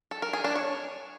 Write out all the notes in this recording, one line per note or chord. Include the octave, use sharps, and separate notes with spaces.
A4
A#4
G#4
D4
C#5